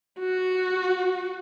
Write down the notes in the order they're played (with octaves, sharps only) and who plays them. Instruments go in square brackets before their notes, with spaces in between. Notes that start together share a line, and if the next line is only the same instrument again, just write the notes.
[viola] F#4